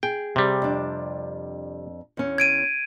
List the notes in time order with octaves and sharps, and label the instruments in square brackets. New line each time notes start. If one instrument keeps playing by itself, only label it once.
[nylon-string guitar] G#4 [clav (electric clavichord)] G5
[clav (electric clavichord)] C3 G3
[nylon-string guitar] F2 D4
E2 C#4
[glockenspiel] G#6 D7 D#7